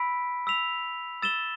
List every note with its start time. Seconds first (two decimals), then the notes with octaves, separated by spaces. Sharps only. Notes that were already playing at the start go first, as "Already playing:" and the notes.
Already playing: B5 E6 B6 D7
0.47 E6 B6 F7
1.22 E6 A6 E7 G7